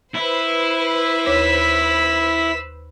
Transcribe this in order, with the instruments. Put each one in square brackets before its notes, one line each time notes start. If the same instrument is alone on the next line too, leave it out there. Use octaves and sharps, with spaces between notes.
[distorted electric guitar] E4 [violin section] B4 C5
[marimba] D#2 C#5 D6 [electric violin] E6 B6